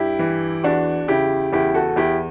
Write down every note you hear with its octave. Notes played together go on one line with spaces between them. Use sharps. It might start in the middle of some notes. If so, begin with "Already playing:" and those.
Already playing: G2 E4 G4
E3
E2 D4 F#4
C#3 E4 G4
E2 E4 G4
F#4 A4
E2 E4 G4